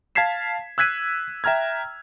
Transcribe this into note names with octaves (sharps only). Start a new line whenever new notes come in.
F5 A5 G#6 B6 C7 E7
E6 F#6 G#6 B6 D#7
E5 G5 A#5 F6 G#6